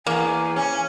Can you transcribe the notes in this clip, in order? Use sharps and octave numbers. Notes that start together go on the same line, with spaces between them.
E2 A#3 G#5
C#4